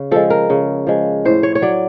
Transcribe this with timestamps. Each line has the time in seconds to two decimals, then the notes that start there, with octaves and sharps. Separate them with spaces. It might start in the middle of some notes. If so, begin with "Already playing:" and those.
Already playing: C#3
0.11 F3 G#3 A4
0.30 A#4
0.50 C#3
0.87 F3 G#3
1.25 A2 C5
1.43 C#5
1.55 C#5
1.62 F#3 D5